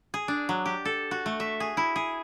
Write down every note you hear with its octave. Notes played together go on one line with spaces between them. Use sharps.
G#4
D4
F#3
G4
A4
F#4
A3
E5
G#4
E4
G#4